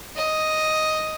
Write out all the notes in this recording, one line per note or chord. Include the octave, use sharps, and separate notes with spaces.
D#5